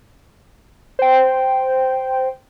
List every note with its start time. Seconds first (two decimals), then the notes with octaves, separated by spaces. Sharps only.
0.99 C5 G5